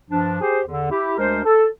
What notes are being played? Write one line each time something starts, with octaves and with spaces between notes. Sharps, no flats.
G2 F3 D4
G4 G#4 C5
E2 D3
E4 G4
D2 G#3 D4 A#4 C5
A4